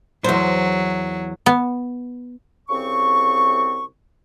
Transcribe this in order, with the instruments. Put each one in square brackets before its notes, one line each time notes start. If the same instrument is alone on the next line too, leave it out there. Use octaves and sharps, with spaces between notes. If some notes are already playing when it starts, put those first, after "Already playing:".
[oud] E2 C5 [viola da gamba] F#3
[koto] B3
[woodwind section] C2 C#3 C4 C#6